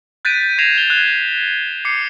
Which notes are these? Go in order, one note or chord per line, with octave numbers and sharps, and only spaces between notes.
F#6 G6 A6 B6 D7 D#7
G#6 A#6 C7 E7 F7
G7
F#6
D6 C7 C#7